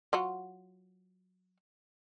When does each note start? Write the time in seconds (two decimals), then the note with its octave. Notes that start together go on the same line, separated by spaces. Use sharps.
0.13 F#3 F4 F#4